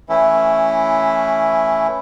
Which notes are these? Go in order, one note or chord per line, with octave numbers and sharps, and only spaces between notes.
E3 A3 C#4 E4